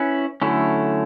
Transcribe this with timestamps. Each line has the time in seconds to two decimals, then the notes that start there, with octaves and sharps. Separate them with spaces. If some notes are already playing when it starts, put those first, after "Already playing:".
Already playing: C#4 E4 B4
0.42 D3 F#3 A3 C#4 E4